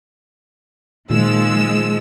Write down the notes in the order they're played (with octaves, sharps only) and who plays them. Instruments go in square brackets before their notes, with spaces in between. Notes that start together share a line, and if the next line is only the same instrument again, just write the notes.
[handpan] A#2 D#3 F4 [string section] F3 G#3 E6